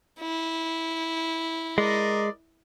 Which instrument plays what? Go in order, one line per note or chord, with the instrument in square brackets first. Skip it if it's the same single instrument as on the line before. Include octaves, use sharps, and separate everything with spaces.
[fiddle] E4
[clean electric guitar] G#3 [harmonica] A#4 D5 D#5